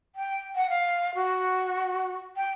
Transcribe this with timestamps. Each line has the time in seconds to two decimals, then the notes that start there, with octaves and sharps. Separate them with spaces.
0.15 G5
0.56 F#5
0.70 F5
1.15 F#4
2.37 G5